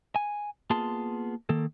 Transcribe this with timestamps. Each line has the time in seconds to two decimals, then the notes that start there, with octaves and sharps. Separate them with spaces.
0.16 G#5
0.70 A#3 B3 F4 G#4 A5 C6
1.49 D#3 A#3 A4